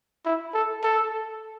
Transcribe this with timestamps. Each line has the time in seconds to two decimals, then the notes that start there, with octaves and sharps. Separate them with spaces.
0.25 E4
0.54 A4
0.83 A4